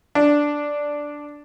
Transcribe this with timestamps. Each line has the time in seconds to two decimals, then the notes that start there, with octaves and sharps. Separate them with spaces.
0.15 D4